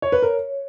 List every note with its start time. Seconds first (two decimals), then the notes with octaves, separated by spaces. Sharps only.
0.02 C#5
0.12 B4
0.22 A#4 C#5